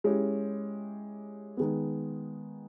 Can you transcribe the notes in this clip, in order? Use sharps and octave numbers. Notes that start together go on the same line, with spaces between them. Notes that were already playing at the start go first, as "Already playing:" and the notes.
G#3 C#4 E4 G4
D#3 G#3 B3